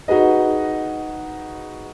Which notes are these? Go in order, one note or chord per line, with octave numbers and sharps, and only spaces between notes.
D#4 F#4 G#4 B4 D#5